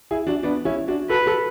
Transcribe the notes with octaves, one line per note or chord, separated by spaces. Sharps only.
E4 G#4
D4 F#4
B3 D4
C#4 E4
D4 F#4
F#4 A4 B4
F#4 A4